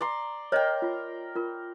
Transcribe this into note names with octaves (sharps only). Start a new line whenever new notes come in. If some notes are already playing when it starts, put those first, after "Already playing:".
D5 A#5 C6
A#4 C#5 D#5 G5
F4
F4 A#4